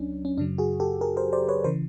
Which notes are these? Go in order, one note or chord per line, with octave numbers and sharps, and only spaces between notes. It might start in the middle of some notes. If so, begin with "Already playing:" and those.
Already playing: C#2 F#3 C#4 D4
C#4
F#2 C#3 F#3 D4
F#4 G#4
G4 A4
G#4 A#4
A#4 C5
C5 D5
B4 C#5
C#3 E3 A#4 C5